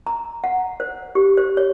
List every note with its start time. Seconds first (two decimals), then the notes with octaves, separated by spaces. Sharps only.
0.07 A#5
0.44 F#5
0.80 C5
1.15 G4
1.37 C5
1.57 C#5